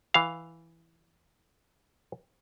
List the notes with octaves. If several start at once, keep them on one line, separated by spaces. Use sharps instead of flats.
E3 F5